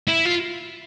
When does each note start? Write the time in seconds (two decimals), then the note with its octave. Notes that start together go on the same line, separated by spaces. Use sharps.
0.08 E4
0.26 F4